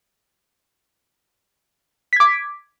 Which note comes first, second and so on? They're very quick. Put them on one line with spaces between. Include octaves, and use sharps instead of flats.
B6 G#6 D6